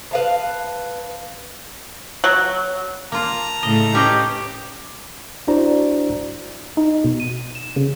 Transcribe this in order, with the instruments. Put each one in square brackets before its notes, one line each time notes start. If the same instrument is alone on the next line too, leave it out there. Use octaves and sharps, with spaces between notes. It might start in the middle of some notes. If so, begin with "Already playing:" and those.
[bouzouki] B4 F5 A5
[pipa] F#3
[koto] A#3 F4 [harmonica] A5 A#5
[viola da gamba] A2 C#3 A3 [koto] D#5
[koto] C#4 G#4 D#5 [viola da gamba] D#4 B4 [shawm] G4
[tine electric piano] D4 E4 F#4 C5 D5 A#5
[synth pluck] D#4
B2
D#7
E7
C#3